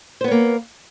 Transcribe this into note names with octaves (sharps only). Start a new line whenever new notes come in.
A#3 B3 C5 C#5